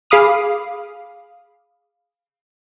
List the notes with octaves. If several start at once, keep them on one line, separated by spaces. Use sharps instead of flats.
G#4 F5 B5 D6 D#6 F6